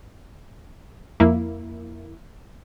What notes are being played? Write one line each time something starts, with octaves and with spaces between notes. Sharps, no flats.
F2 A#3 E4